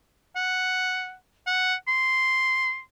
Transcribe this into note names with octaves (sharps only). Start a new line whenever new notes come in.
F#5
F#5
C6